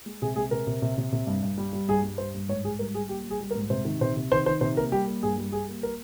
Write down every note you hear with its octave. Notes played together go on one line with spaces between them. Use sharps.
G#3
C3 G#4
G#3 G#4
C3 A#4
C3
C3
C3
C3
G2
G2
G3
G3
G2 G#4
G3
G2 C5
G2
G#2 C#5
G#2 G#4
G3 A#4
G3 G#4
A#3 G4
G3
G#4
G3
A#4
G#2
C3 C5
D#3
C3 C5
C3
D#3 C5
D#3 C5
C3 C5
A#3 A#4
G3 G4
A#3
G2 G#4
G3
G3 G#4
A#3
A#4